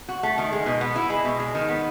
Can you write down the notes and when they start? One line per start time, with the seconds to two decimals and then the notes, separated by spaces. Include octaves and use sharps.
0.09 F#4
0.23 A3
0.38 D#3
0.53 G#3
0.66 B2
0.81 B3
0.96 E4
1.10 G#3
1.25 B2
1.40 G#3
1.55 D#3
1.68 B3